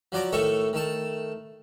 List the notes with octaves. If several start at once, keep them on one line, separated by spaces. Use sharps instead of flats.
F3 F#3 D5 A#5 D6
A2 D#3 A3 A4 E5 C#6
D#3 A3 A5